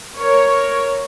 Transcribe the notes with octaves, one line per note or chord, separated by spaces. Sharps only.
A#4 C#5